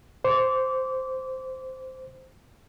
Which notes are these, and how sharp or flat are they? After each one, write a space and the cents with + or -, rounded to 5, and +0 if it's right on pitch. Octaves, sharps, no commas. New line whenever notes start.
C5 -5 D6 -25